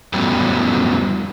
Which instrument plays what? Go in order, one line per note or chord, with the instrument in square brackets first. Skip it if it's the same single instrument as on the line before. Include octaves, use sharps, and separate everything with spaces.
[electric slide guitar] F2 A2 F#3 G3 B3 C#4